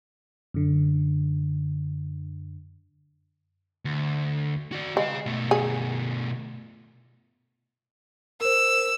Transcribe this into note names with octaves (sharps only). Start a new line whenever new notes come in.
F#2 D3
D2
F#4 D5
G#3 G#4 F5
B2 A3
G#4
A#4 C5 E6